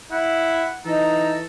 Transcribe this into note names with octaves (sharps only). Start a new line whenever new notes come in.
E4 F#5
E3 D#4 A4 A#5